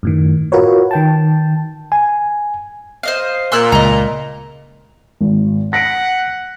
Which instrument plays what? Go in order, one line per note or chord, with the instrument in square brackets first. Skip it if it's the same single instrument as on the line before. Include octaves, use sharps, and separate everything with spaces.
[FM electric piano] F#2 A2 D#3
F4 F#4 A#4 B4 C#5
D#3 G5 A5
[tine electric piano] G#5
[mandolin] C5 D#5 F5
[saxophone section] A#2 [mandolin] C6 E6 F#6
[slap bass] C#2 [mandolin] D#5 A#5
[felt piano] G#1
[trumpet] F#5 [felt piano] A#6 B6 D7